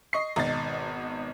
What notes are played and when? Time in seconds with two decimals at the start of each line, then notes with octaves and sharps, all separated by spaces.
0.13 D#5 C#6 C7
0.36 G#1 B2 D#4 A6